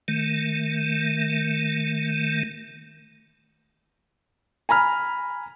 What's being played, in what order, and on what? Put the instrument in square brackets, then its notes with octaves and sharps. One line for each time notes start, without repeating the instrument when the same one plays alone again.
[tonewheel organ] D#3 A3
[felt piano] G#5 A#5 B5 F6